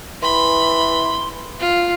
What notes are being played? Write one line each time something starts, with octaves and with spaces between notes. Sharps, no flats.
E3 B5 C6
F4